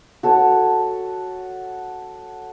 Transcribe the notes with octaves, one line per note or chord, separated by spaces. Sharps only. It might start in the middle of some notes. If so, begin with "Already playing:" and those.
F#4 A4 C#5